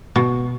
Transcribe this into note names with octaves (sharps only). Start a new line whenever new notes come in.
B2